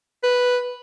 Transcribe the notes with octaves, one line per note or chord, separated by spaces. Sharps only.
B4